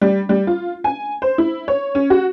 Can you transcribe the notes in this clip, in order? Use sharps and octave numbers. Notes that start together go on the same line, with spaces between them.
G3
G3
F4
G#5
C5
E4
C#5
C#4
F#4